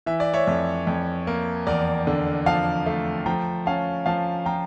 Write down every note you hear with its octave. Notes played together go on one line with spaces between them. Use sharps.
E3 E5
D5
C#5 E5
F2
F2
A#3
E2 A#4 D5
D3
F3 F5 A5
A3
F3 G5 A#5
C#4 F5 A5
F3 F5 A5
F3 G5 A#5